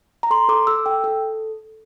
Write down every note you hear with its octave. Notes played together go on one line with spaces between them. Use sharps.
A#5
A4 C6
A4 D6
A4 E6
A4 G5
A4